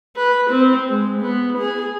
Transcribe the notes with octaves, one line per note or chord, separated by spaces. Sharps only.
B4
C4
G#3
B3
G#4